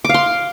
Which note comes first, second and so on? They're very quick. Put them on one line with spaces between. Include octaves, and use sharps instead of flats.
D6 F5 C6